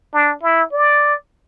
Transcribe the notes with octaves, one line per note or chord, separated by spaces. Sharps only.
D4
E4
D5